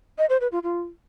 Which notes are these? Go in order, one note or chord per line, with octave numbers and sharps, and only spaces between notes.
D#5
C5
B4
F4
F4